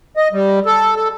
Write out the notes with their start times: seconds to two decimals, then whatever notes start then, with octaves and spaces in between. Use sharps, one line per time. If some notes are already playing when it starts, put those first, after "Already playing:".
0.17 D#5
0.33 G3
0.66 A4
0.96 A4